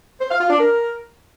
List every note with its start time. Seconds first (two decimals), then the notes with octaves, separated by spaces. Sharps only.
0.21 C5
0.31 F5
0.40 F4
0.50 D4
0.60 A#4